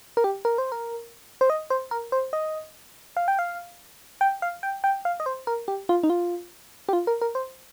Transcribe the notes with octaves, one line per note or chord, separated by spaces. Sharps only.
A#4
G4
A#4
C5
A#4
C5
D#5
C5
A#4
C5
D#5
F5
G5
F5
G5
F5
G5
G5
F5
D#5
C5
A#4
G4
F4
D#4
F4
G4
F4
A#4
A#4
C5